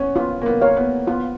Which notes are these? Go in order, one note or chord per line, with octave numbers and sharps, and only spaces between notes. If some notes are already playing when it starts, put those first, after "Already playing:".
Already playing: B3 C#4
B3 F4
A#3
B3
A#4 C#5 F5
B3
B3 F4